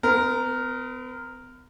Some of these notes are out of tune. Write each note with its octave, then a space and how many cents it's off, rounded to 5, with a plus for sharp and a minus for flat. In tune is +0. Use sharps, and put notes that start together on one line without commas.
B3 +45 A#4 +0